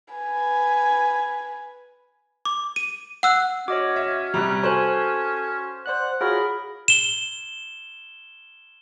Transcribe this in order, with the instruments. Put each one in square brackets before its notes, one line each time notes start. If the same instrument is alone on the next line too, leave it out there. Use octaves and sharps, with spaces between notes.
[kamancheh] B4 G#5
[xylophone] D6
D#7
F#5 E6 F#6
[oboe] C#4 [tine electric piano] F#4 [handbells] C#5 D#5 D6
[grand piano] E5
[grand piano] C3 G3 [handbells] A#5 F#6
[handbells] F#4 G#5 [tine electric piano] A4 F#6 [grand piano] C5
[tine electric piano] C5 D5 F#6 [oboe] F#5
[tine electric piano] F4 F#4 C#5 [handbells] G#4 B5 [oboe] A#4
[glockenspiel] E7 G7